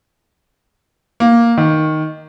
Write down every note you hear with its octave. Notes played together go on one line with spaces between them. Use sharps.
A#3
D#3